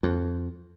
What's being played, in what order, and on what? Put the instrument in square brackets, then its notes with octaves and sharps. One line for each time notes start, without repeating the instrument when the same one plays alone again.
[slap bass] F2